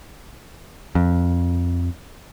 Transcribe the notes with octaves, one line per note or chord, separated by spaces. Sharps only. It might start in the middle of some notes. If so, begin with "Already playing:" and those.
F2